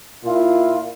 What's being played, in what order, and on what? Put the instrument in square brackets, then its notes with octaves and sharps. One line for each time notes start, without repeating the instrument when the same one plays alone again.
[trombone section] A#2 E4 F4